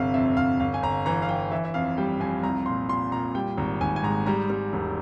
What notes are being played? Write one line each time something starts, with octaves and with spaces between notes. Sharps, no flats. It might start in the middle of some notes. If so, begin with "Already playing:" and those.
Already playing: G1 C3 E5 F5
F2 E5
G1 F5
G1 F5
G#5
G1 A#5
E3 A#5
F5
E3 G5
E3 E5
E5
F2 F5
G3 G5
F2 G#5
C2 A#5
A#2 C6
A#2 C6
A#2 A#5
G3 G5
G#1 A#5
G#1 G#5
G#5
G#2 A#5
G3 A#5
G3
E1